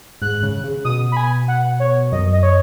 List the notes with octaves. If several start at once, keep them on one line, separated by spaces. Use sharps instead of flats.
G#2 F#6
C#3
C#3
B2 D#6
B5
G#5
F#5
C#5
F#2 D#5
D#5
C#5